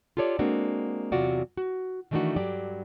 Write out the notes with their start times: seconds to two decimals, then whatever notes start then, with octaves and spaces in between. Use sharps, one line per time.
0.17 F4 G4 A4 C#5 D5
0.39 G#3 A#3 C4 D4 F#4
1.12 E2 C3 F#3 F4 F#4 D5
1.57 F#4
2.11 D#3 E3 A3 D4 D#4 F#4
2.36 G2 F#3 G4 D5